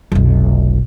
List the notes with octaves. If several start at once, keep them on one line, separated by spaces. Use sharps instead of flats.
F1 B1